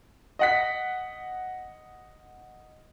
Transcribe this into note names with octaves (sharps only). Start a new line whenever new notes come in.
D#5 F#5 B6